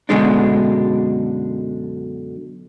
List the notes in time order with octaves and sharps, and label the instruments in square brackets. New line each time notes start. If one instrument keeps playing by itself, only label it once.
[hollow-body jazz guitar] F#2 B2 D3 G#3 D4